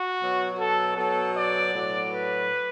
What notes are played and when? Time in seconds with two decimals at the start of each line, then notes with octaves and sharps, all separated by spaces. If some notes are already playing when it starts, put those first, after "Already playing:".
Already playing: F#4
0.21 B2 F#3
0.59 A4
0.97 B2 F#3 A4
1.36 D5
1.74 A2 F#3
2.11 B4